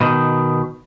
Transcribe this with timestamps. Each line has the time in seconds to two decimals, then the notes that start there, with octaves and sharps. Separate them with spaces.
0.01 B2 D#3